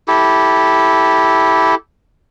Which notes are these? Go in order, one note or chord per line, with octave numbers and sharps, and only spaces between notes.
E4 G4 A4